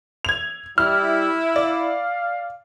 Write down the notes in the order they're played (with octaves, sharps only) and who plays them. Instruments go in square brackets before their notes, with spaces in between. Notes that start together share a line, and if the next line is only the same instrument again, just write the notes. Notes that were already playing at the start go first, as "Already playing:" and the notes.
[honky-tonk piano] G#6 F7
[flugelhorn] G3 [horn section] E4 [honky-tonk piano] F6
[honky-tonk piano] D5 [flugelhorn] F5